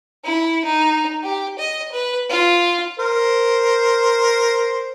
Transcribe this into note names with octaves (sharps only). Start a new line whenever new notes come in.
E4
D#4
G4
D#5
B4
F4
A#4 C5